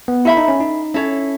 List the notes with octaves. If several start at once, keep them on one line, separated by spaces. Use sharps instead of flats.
B3
E4 A4 E5 B5
D#4
C#4
D#4
C#4 E4 A4 C#5